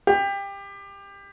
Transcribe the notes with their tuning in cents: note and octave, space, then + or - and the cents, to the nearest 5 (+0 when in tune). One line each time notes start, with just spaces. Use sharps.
G4 +20